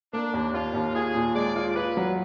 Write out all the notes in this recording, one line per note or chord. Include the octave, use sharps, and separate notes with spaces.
A#3 D4
D#2
D#2 F4
D#2
F4 G#4
A#2
G#3 D5
F4
F4 B4
F#3